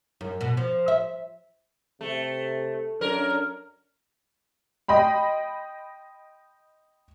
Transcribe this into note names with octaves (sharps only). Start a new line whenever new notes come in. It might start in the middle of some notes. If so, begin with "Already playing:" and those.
F#2
B2
F3
E5
C3 A3
F#2 D4 A#4
D#5 G5 B5 C6